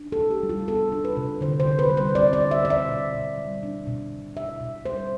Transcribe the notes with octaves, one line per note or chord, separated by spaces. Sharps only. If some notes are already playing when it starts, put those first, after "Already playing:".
Already playing: D4
A4
C3
G4
G3
F4
B3 A4
D4
B4
C3
D3 C5
C5
D3
B4
G3
C5
C4 D5
D5
D3
E5
D3 D5
E5
B2
B2
G3
D4
B2
B2
B2 E5
B2
G3 C5